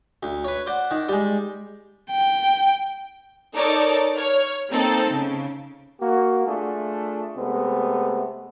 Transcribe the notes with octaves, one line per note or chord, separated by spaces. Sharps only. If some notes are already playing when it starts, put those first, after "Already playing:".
D2
B4 C#5
C5 D5 F#5
D#3
G3 G#3
G5
D#4 A4 A#4 C#5 D5 D6
C#5 F6
A#3 C4 D#4 A4
C#3
A#3 F#4
A3 D4 F4 G#4
C3 G#3 A3 B3